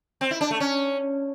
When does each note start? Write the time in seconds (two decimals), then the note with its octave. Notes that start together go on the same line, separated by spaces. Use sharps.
0.21 C4
0.31 E4
0.41 D4
0.51 A3
0.60 C#4